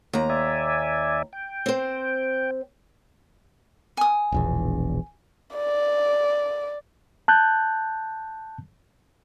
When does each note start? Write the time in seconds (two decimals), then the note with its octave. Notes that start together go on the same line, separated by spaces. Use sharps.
0.13 D#2 A#5
0.30 D5 E5 G#5
1.33 G5
1.66 C4 C5
3.97 G#5 D#6
4.32 E1 A#1 E2
5.54 D5
7.28 A5 F#6 G6